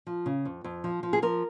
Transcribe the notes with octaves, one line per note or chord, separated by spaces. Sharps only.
F3
C#3
F2
F2
F3
F3
G#4
F3 A#4